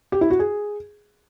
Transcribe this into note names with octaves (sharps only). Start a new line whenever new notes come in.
G4
E4
F#4
G#4